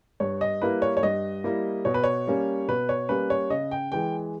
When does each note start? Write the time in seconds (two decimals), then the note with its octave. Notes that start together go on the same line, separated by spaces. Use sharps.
0.20 G2 C#5
0.41 D#5
0.62 G3 A#3 E4 B4
0.82 C#5
0.97 C#5
1.03 G2 D#5
1.44 G3 A#3 E4
1.85 B2 C#5
1.94 B4
2.04 C#5
2.27 G3 A#3 C#4
2.68 B2 B4
2.89 C#5
3.09 G3 A#3 C#4 B4
3.30 C#5
3.50 C#3 D#5
3.71 G5
3.92 E3 G#3 G5